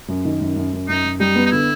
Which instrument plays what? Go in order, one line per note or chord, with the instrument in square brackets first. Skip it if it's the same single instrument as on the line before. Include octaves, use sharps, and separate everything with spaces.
[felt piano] F#2
D#3
F#2
F#2
F#2
[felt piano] F#2 [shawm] D#4
[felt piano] F#2
[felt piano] G3 [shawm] D#4
[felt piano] B3
[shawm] D#4
[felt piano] D3 [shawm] E4